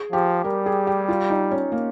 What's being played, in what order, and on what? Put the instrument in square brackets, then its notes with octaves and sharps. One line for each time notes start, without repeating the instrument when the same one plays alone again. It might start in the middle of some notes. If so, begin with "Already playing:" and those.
Already playing: [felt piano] G#4
[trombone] F3 [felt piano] G4
[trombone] G3 [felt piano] A#4
[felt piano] G#4
G4
F4
D#4
C#4
A#3